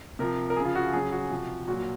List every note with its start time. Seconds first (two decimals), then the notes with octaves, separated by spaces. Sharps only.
0.19 C3 F3 A#4
0.50 A#4
0.56 C#3 F3 G#4
0.65 F4
0.75 F#4
0.93 C#3 F#3 G#4
1.12 F#4
1.30 C3 F3
1.68 A#2 F#3 F#4